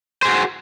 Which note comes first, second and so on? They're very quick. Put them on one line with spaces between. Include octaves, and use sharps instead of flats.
C5 G#4 F#4